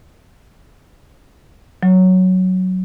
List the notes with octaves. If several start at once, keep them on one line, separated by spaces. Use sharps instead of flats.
F#3